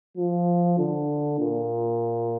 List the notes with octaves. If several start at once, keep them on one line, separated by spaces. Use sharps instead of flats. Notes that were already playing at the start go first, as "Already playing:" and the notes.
F3
D3
A#2